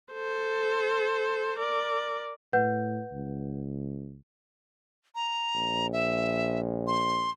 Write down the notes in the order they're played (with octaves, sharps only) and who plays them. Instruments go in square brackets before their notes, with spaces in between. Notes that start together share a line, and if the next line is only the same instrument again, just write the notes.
[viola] A4 C5
A#4 D5
[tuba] A2 [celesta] B4 F#5 G6
[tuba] C#2
[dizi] A#5
[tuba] A#1
[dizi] E5
C6